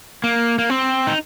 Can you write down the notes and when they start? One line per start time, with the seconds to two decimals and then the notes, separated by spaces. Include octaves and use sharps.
0.24 A#3
0.59 A#3
0.70 C4
1.07 D#4